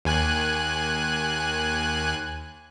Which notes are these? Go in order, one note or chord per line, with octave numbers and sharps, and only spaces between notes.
D#2 G#5 F#6